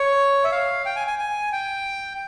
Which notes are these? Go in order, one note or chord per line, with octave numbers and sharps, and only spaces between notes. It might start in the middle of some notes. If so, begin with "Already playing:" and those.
Already playing: C#5
E5
F5
G5
G#5
G#5
G#5
G5